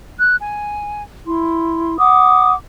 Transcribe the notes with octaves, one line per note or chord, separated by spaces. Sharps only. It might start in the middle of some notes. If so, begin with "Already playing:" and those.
F#6
G#5
E4 C6
F#5 D6 D#6